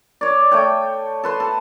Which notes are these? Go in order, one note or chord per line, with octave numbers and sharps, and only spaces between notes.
C#5 D5
A3 C#5 G5
A4 B4 C6
A4